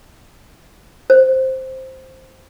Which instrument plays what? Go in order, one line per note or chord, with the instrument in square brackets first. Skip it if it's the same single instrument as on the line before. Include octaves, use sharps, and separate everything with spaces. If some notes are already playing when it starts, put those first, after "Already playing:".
[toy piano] C5